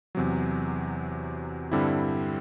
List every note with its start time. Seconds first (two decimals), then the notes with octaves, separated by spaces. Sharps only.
0.15 E2 C3 F#3
1.72 G2 D3 G3 C4 E4